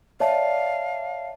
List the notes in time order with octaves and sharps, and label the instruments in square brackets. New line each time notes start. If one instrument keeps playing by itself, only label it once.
[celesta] C#5 E5 A5 [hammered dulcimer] D5 [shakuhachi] F5